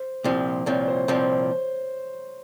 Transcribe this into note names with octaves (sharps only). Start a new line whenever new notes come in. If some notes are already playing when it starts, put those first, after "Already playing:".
Already playing: C5
C2 A#2 F3 C4
C2 A#2 F3 C4 C#5
C5
C2 A#2 F3 C4 C5